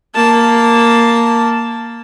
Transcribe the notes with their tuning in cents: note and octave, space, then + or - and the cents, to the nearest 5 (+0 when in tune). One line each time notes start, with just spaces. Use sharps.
A#3 +0 A5 +0